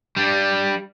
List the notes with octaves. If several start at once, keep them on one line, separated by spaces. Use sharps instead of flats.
G3 D4